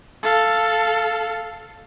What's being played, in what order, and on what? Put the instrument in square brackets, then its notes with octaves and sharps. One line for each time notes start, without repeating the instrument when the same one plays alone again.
[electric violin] A4 F5